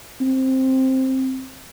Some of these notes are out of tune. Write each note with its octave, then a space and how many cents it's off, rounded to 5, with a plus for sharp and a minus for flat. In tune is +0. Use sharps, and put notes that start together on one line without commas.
C4 +5